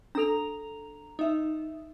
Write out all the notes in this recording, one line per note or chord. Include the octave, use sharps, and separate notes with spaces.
D4 A4 A#5 F7
D#4 E5